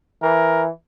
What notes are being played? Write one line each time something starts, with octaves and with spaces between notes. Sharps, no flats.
E3 A#4